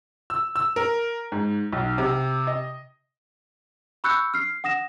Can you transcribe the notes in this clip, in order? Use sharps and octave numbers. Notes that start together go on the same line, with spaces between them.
E6
E6
A#4
G#2
B1
C3
D#5
B5 C#6 E6 F#6 G6 C#7
F6 C7
F#5 D#6 A#6 E7